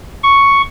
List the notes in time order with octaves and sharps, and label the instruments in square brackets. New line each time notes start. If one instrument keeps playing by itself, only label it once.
[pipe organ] C#6